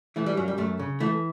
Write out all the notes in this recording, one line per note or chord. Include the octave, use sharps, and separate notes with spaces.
E3 A3
G3
F#2 F#3
G3
F#2 A3
C#3
E3 A3